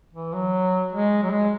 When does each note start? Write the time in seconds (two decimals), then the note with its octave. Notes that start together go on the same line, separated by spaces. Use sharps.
0.13 E3
0.34 F#3
0.93 G#3
1.23 F#3
1.32 G#3